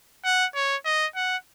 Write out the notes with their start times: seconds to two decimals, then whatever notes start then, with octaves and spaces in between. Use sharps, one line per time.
0.24 F#5
0.55 C#5
0.85 D#5
1.16 F#5